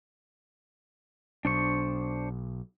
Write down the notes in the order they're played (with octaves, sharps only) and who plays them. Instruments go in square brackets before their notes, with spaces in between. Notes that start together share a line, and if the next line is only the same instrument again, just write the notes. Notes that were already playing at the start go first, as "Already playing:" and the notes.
[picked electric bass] B1 [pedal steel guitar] D4 C5 C#6